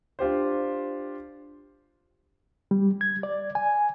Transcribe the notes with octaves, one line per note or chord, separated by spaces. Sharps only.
D4 F4 G4 C5
G3
G#6
D5
G#5